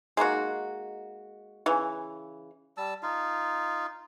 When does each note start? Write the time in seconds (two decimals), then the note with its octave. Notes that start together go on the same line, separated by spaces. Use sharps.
0.17 G#3 A#3 D#4 F#4
1.66 C#3 E3
2.77 G3 A5 E6
3.03 D#4 F4